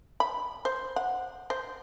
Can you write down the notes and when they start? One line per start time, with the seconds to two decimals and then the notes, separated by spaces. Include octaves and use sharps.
0.20 B5
0.65 C5
0.96 F#5
1.50 C5